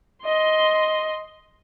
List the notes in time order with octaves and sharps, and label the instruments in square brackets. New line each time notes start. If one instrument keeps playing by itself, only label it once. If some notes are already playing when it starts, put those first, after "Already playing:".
[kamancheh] D#5 C6